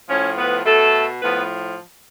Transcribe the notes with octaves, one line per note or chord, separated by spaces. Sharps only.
A2 F3 C#4 C#5
B3 B4
B2 A3 A4
A2 F3 B3 B4